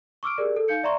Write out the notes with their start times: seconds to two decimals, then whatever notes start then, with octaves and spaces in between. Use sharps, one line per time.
0.23 C#6 D6 E6 F6 D7
0.38 G4 G#4 A#4 D5
0.56 A4
0.68 D#4 F5 G6 C#7
0.83 D5 E5 A#5 C6 C#6